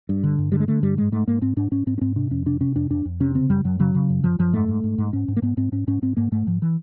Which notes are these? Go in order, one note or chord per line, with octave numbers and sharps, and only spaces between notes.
G2
D3
G2
D3 G3
G#3
D3 A3
G2 G3
G#2 G#3
G#2 A3
G#2 A#3
G#2 C4
G#2 D4
G#2 C#4
G#2 C4
C#4
G#2 C4
C3 D4
F2 C#4
C3 D4
C3 C#4
F2 D4
F2 D4
F2
C3 C#4
C#3 C4
F#2 G3
F#2 F#3
C#3 F#3
C#3
F#2
F#2 F3
F#2 F3
G#2 A3
G#2
G#2
G#2
G#2 C#4
G#2
A#3
G#2 B3
G#2 C4
G#2 C#4
G#2 C#4
G#2 C4
G#2 A#3
G#2 A3
G#2 F3
E3